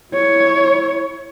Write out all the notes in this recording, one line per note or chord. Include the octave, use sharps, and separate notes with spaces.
E4 C#5